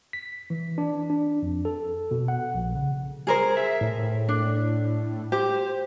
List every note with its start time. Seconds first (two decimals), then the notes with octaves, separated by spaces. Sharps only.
0.13 B6
0.50 E3
0.78 D4
1.10 D4
1.43 F2
1.65 A4
2.11 B2
2.28 F#5
2.55 A#1
2.75 C#3
3.27 G#4 A#4 C5
3.57 E5
3.81 A2
4.29 D4
5.32 G4 C5